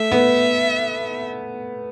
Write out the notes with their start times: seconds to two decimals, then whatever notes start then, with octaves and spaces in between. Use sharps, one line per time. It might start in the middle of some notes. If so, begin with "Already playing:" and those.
Already playing: A3 E5
0.12 B3